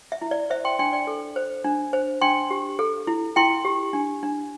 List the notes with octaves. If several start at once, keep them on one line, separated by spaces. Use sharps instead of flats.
E5
E4
D5
C5 E5
G5 C6
D4 G5 C6
D5 G5
A4
C5
D4
C5
D4 G5 C6
G4
A4
E4
E4 G5 C6
G4
D4
D4